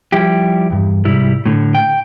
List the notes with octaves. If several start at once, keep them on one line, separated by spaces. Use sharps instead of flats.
F3 G3 E4 G4
E2 G2
C2 G#2 G3 E4
A2 D3
G5